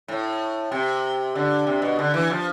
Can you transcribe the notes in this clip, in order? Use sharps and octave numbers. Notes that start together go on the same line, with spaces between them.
A2
C3
D3
C3
B2
D3
E3
F3